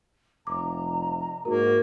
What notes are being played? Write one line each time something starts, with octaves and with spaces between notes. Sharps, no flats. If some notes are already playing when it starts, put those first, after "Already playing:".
F1 A#5 D6
G#2 A#3 F#4 A#4